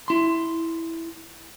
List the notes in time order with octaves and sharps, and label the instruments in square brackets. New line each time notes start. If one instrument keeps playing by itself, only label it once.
[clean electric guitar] E4 C6